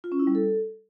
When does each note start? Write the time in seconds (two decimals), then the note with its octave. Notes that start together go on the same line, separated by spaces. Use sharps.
0.04 F4
0.12 C#4
0.19 E4
0.27 G3
0.35 A4